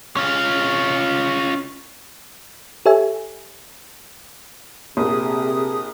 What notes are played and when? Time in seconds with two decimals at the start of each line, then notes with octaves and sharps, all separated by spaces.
0.17 C#4 F4
2.86 G4 A4 C#5 E5 G#5
4.97 A#1 C3 G#4 D#6